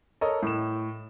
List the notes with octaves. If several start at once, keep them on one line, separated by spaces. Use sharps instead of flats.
A4 A#4 C#5 D#5
A2 E7